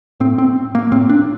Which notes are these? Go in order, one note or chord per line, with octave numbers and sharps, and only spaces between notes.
A2 C4
C4
A#3
A2 C4
D4